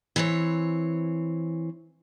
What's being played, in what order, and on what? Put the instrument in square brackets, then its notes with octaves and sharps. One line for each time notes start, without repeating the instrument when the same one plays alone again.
[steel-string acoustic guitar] E3 C4 C#5